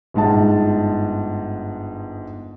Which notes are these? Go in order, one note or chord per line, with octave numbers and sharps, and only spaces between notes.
G1 G#2 G#3 A5